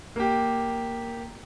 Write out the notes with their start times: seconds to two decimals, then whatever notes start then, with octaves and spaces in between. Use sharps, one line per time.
0.16 A#3 G4